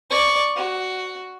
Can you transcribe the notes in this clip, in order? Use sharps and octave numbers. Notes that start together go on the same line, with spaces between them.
D5 C#6
F#4